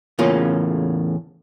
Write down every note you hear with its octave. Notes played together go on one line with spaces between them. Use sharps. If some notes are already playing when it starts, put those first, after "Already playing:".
E2 A2 C#3 A#3 C#4 F4